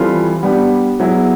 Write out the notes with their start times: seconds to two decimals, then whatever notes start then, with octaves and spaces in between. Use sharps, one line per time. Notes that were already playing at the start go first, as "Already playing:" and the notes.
Already playing: E3 G3 C4 F4 A4
0.43 G3 B3 D4 G4
1.00 F#3 B3 E4 G#4